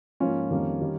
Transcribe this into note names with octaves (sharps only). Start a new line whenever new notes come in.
G#2 F3 A#3 C#4 F4
F2 D#3 G3 A#3
D#3 G3